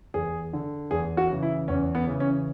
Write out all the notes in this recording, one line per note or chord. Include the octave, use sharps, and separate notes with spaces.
E2 G#4
D3
E2 G#4
F#4
C#3 E3
E4
E2 C#4
B3
C#3 E3
C#4